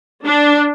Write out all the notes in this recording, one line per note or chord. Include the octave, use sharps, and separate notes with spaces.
D4